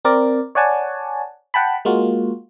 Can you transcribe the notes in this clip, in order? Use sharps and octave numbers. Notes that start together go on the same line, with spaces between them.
C4 A#4 D5
C#5 D5 F#5 G#5 A5
F#5 G5 A5 B5
G#3 A#3 F4 F#4